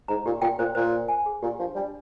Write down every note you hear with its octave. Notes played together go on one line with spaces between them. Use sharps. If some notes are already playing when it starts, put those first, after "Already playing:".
G#2 A#5
A#2 G4
A#2 G5
A#2 C5
A#2 C5
C5
G#5
G#4
A#2 G4
F3 D4
G3 D4